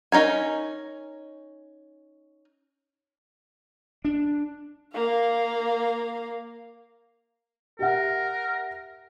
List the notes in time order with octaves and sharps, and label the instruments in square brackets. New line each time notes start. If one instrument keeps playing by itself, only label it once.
[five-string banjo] C#4 D#4 A#4 G#5
[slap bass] D4
[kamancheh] A#3 F5
[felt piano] G4 E5 F#5 [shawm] A#4